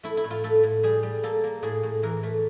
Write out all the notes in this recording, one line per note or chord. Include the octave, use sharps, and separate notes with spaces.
A3 E4
E4
A2
F4
A3 A4
A2
G3 G#4
G3
A#3 A4
A#3
A2 G#4
A2
E3 A#4
A3